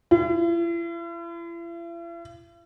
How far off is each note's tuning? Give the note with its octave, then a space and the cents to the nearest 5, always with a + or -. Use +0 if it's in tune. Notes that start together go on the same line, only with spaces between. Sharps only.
E4 +45